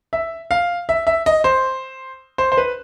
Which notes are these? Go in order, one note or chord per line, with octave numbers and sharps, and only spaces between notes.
E5
F5
E5
E5
D#5
C5
C5
C5
B4